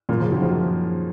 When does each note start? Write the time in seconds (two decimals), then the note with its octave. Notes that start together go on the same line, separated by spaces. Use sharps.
0.09 F#2 A#2
0.20 C#3 F3
0.32 D#3 F#3
0.42 F3 G#3